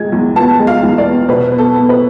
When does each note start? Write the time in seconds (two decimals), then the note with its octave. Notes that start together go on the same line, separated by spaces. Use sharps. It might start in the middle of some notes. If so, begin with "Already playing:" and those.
Already playing: G#3 G#6
0.12 E2
0.36 B3 A5
0.59 G#3
0.67 F5
0.83 E2
0.98 D5
1.06 B3
1.29 B2 B4
1.52 B3
1.58 A4
1.75 B3
1.89 B4